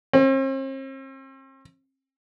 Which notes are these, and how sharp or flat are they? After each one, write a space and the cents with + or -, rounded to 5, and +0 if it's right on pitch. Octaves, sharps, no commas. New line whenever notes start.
C4 +45